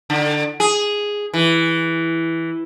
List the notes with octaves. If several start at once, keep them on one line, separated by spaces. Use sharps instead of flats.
D3
G#4
E3